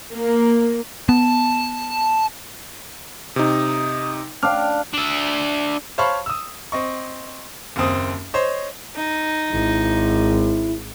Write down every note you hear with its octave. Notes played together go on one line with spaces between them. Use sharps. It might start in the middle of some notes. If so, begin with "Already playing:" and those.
A#3
B3 A5
C3 D#4 D#6
D4 F5 G5 F6
D4 E5
C5 C#5 F5 A5 B5 C#6
D#6 E6
C4 D#5 C#6
F#1 D#2 C4 D#6
C5 C#5 D#5
D#4
G#1 E4